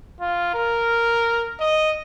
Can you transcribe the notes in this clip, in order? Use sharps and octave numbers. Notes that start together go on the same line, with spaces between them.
F4
A#4
D#5